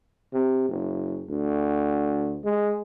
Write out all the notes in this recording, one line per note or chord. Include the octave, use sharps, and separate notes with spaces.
C3
F#1
D2
G#3